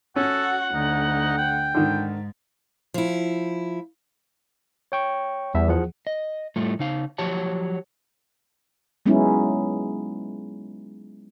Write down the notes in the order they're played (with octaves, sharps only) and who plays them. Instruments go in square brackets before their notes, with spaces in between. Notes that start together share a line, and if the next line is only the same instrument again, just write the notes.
[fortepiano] C#4 [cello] F#4 [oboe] A4 [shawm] F#5
[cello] D2 [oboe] D#4
[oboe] G5
[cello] G#2 [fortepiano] D3 D#3
[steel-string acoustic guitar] F3 E4
[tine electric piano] C#5 G5 C#6
[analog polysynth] E2 [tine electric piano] G3 E5
[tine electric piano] F3 G#4 F#5
[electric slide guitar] D#5
A2 G3 A3 F4
C#3 D#4 F5
F3 F#3 G4 C#5 A5
[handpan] F#3 G#3 B3 C#4 D#4 E4